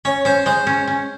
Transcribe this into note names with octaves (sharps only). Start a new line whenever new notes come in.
C#4 C#5
C#4 C5
G#3 C5
C#4
C#4